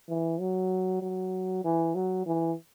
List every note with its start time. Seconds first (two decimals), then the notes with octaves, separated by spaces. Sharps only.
0.09 E3
0.40 F#3
1.02 F#3
1.64 E3
1.95 F#3
2.26 E3